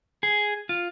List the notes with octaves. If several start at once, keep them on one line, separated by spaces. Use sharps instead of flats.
G#4
F4